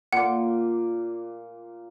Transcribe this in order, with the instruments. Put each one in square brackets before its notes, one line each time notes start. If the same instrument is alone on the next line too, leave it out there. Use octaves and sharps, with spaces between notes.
[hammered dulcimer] A#2 C6 D6 [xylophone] F#5